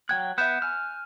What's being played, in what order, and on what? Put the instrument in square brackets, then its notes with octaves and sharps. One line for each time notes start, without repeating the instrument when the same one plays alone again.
[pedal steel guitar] F#3 G5 F#6 [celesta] G#6
[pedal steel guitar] B3 E5 [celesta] F#6 G6 E7
[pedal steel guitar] G#5 F6